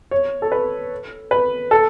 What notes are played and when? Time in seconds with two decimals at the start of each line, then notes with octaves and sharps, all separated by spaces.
0.11 C#5
0.42 A4
0.52 B4
1.31 B4
1.71 A4